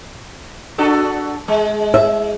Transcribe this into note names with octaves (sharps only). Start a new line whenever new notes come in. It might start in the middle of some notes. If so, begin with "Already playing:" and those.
D4 F#4 A4
G#3
E5